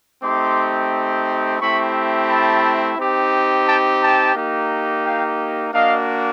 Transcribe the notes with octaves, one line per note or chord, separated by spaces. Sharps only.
A3 C4 D#4 G4 C6 D6
A3 C4 E4 G4 B5 C#6
A5 B5
C4 D#4 G4
G5 A5
G5 A5
A#3 D#4 G4
F5 G5
A#3 D4 F#4 D#5 F5